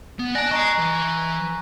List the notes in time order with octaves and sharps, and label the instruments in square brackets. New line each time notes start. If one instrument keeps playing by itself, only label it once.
[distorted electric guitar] B3
[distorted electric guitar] D5 A5 [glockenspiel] G#5 F#6 A#6
[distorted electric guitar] D#5 G#5 [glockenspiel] A#5 C#6
[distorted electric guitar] E3